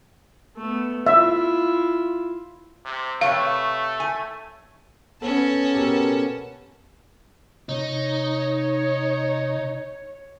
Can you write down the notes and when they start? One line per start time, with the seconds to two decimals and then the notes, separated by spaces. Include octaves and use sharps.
0.57 A3 B3
1.07 E4 F4 E5
2.85 C3
3.21 C3 A3 B4 C#5 F5
4.00 G#5
5.22 B3 C#4 A4 A5
5.75 B2 B3 G4 A4 A#4
7.69 C3 D#4 C#5